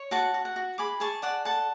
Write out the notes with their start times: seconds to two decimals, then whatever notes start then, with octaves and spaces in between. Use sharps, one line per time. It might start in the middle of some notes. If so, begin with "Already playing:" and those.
Already playing: C#5
0.11 F#4 F#5 A5
0.34 F#4
0.45 F#5
0.56 F#4
0.78 G#4 B5 D6
1.00 G#4 A5 C#6
1.22 D5 F#5 A5
1.45 A4 F#5 A5